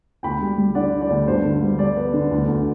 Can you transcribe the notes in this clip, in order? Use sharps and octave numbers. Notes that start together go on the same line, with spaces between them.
D2 G5 B5
G3
G3
D3 D5 F#5
D3
D5
D2
G2 C5
D3
G3
G3 D5
B3
D3
D2
D2